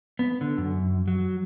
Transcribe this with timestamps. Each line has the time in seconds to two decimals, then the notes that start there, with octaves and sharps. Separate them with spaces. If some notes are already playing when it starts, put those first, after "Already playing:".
0.19 B3
0.41 D3
0.58 F#2
1.08 F#3